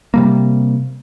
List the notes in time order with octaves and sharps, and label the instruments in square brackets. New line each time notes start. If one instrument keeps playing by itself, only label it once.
[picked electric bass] C3 G3 A#3